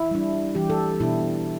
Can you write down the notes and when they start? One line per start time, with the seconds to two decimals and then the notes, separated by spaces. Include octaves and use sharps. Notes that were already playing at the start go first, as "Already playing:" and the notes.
Already playing: E4
0.11 G3 D4
0.55 E3 G3 E4 G4
0.70 A4
1.00 B2 B3 D4 E4